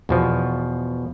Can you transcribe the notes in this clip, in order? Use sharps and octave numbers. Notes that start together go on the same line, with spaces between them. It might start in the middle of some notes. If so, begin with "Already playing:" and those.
E2 B2 F3